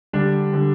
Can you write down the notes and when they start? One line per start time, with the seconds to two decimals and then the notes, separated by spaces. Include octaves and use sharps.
0.13 D3 G3 D4
0.53 D3 G3